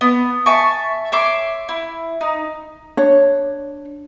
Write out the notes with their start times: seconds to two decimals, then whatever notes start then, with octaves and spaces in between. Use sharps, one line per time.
0.01 B3
0.46 E5 G#5 A5 C#6
1.12 C#5 E5 C6 D6
1.69 E4
2.21 D#4
2.97 D4 C#5